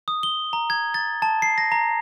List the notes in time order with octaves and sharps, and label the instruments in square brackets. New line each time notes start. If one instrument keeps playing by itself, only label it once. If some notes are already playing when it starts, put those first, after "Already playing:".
[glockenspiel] D#6
G7
A#5
G#6
A6
A5
C7
A#6
A#5